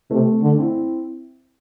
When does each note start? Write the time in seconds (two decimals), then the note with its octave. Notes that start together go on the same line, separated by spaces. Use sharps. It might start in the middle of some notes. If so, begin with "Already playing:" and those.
0.11 C3 A3
0.43 D3
0.58 C4 E4